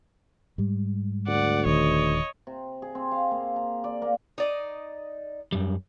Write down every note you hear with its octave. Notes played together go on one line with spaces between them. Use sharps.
G#2 G3
D2 D5 F#5
D#1 D#3 C#5 D#5
C3
G#4
C4
F5
A#3
A#5
D5
A#3
D#4 D5 D#5
F#2 G3